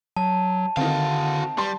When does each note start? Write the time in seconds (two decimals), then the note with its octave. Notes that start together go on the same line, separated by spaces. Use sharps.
0.16 F#3 A5
0.77 D3 D#3 C4 F#4 F5
1.58 G3 C6